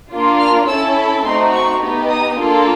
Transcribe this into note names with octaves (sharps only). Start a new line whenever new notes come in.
A#3 D4 F4
F6
C#4 E4 A4 E6
B5
A3 C4 D#4 F#4 C6
C#6
B3 D#4 G4
D#6
A#3 D4 F4 A4